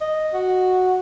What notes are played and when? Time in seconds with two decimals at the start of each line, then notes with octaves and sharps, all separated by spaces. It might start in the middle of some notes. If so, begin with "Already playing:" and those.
0.01 D#5
0.34 F#4